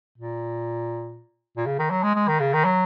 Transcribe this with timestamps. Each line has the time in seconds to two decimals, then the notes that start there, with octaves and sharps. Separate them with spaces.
0.18 A#2
1.57 A#2
1.66 C#3
1.79 D#3
1.91 F#3
2.03 G#3
2.15 G#3
2.28 D#3
2.40 C#3
2.53 D#3
2.65 F#3